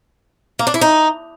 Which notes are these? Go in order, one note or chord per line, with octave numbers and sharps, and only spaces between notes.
A#3
D4
E4
D#4